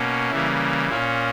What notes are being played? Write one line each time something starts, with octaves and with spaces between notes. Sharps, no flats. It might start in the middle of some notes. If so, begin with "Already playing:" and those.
Already playing: B2 A#3 C#4
C#3 E3 G3 A#3 E4
A#2 A#3 C#4 E4